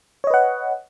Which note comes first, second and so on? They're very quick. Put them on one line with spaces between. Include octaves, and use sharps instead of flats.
C#5 D#5 B4 F#5